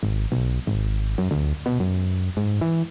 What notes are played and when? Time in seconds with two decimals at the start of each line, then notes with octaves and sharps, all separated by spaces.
0.03 G#1
0.32 B1
0.67 G#1
1.18 F#2
1.31 D2
1.66 B2
1.80 F#2
2.37 G#2
2.61 E3